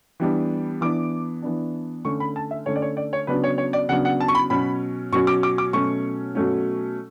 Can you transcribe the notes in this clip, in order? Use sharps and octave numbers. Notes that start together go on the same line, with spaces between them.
E3 G3 B3 D4
E3 B3 D4 D6
E3 B3 D4
D3 A3 C#4 C#6
B5
A5
E5
D3 A3 C#4 C#5
D5
C#5
D5
C#5
C#3 F#3 B3 D4 B4
C#5
C#5
D5
C#3 F#3 B3 D4 F#5
F#5
A5
C#6
B5
B2 F#3 C#4 B5
B2 F#3 C#4 C#6
D6
D6
D6
B2 F#3 A3 C#4 C#6
B2 F#3 A3 C#4